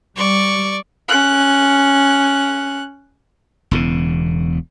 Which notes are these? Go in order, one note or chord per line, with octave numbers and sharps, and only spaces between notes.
G3 D5 C#6
C#4 F#6
E1 E2 C#3